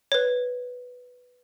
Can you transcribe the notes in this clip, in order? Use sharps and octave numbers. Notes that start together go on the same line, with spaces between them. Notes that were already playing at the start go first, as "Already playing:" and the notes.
B4 C#5